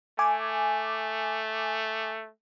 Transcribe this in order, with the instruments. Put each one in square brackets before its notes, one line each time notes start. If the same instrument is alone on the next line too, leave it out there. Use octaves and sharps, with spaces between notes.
[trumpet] A3 [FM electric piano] G#5 D6